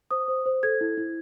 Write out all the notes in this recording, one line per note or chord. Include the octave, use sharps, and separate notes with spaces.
C5 D#6
C5
C5
A4 G#6
E4
E4